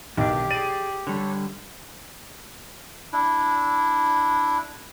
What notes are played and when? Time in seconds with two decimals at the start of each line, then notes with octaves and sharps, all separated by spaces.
0.17 B1 D#3 D4 G4
0.51 G#4 D5 D#7
1.07 D3 G3 D4 A4 C#5
3.13 D4 E4